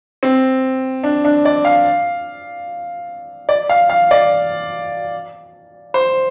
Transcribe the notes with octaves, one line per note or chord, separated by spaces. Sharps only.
C4
D4
D4
D5
F5
D5
F5
F5
D5
C5